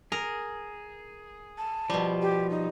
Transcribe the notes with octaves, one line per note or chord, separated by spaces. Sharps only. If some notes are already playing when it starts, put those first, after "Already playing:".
G#4 A#4
A5
B2 F3 G3
G4
D#4